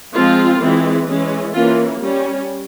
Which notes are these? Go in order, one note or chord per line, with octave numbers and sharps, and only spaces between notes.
F3 G#3 C4 F4
E3 G#3 C4
E3 G#3 C#4
E3 A#3 C#4 F4
G3 C#4